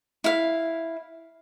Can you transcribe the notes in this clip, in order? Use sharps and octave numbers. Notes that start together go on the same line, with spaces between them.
E4 F5